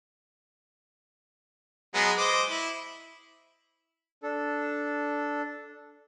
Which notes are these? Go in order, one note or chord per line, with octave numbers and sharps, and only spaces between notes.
F#3 G#3 B3
C5 D#5 D6
E4
D4 A4